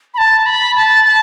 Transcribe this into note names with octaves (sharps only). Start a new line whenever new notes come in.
B5
A5
B5
A5
A5